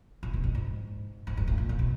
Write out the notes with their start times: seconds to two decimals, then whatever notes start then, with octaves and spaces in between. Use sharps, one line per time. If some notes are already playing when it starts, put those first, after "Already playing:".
0.23 A#2
0.33 B2
0.44 G2
0.55 G#2
1.27 G#2
1.37 G2
1.47 A2
1.58 A#2
1.69 A#2
1.79 B2